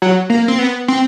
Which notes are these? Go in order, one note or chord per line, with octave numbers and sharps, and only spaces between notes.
F#3
A#3
C4
B3
C4